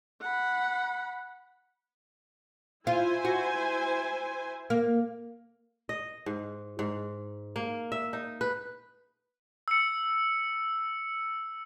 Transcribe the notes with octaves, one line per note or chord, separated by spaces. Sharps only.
F#5 B5
E4 F4 C5 G#5
F#4
A#3
D#5
G#2
G#2
A#3
E5
D#4
B4
E6 C#7